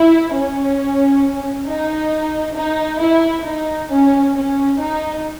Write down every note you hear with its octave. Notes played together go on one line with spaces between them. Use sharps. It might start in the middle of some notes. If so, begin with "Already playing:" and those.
Already playing: E4
C#4
D#4
D#4
E4
D#4
C#4
C#4
D#4